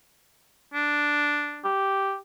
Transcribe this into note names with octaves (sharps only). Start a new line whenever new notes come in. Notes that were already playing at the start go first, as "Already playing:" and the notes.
D4
G4